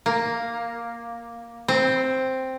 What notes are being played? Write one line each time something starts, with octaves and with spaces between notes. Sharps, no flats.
A#3
C4